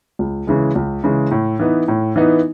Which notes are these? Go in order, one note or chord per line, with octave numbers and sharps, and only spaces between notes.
C#2
C#3 E3 G#3
C#2
C#3 E3 G#3
A2
E3 B3 D#4
A2
E3 B3 D#4